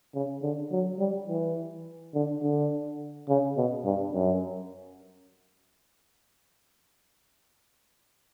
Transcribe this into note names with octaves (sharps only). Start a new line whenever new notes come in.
C#3
D3
F#3
G3
E3
D3
D3
C#3
B2
G2
F#2